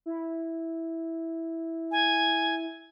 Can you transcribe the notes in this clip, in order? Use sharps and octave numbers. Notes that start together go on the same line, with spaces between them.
E4
G#5